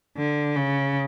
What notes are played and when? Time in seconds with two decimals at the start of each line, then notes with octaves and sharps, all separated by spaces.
0.17 D3
0.56 C#3